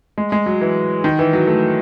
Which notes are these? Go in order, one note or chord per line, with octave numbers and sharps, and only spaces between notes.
G#3
G#3
F#3
E3
D#3
E3
F#3
A3